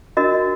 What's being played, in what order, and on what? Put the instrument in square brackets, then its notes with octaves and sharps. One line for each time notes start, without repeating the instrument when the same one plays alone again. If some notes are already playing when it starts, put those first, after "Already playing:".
[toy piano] D4 F#4 A#4 D#5